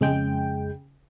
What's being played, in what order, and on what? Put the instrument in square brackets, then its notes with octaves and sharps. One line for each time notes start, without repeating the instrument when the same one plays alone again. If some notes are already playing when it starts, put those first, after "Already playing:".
[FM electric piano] F2 G#3 G5 [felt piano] C#3